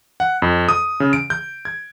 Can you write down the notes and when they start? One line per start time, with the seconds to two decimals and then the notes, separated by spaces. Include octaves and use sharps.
0.20 F#5
0.42 F2
0.69 D#6
1.00 C#3
1.13 D7
1.30 G6
1.65 G#6